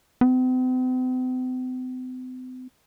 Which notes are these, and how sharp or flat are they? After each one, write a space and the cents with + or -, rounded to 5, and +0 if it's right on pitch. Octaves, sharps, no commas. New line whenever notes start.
C4 -45